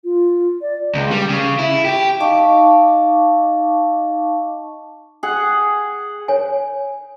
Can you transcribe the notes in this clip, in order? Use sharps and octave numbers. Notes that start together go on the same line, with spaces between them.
F4
D5
C#2
G3
C#3
E4
G4
D#4 D#5 F5 A5 C#6 D6
G#4 F#5
C#5 G#5